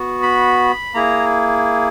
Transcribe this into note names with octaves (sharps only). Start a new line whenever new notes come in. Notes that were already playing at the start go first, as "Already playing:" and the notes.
Already playing: B3 F#4
B5
A#3 E4 G#4 A#5